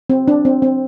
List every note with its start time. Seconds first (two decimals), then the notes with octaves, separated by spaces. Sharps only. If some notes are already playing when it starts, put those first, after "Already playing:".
0.10 C4
0.28 D4
0.45 C4
0.62 C4